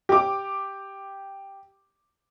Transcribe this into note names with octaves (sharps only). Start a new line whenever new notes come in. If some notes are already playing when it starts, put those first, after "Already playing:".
G4 D6